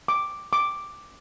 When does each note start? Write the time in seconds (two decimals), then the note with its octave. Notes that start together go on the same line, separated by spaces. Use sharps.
0.08 D6
0.53 D6